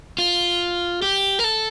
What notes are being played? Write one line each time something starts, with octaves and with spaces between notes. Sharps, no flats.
F4
G4
A#4
A4